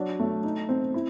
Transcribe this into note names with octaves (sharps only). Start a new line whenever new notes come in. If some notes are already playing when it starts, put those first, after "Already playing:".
Already playing: F#3 D4
A3
D#4
C4
E4